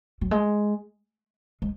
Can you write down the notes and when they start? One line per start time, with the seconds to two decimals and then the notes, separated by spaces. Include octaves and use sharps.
0.21 F#3
0.31 G#3
1.62 G#3